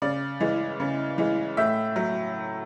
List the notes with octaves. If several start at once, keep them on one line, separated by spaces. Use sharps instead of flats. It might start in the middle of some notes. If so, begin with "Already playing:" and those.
C#3 D5
E3 G#3
C#3
E3 G#3
A2 E5
F#3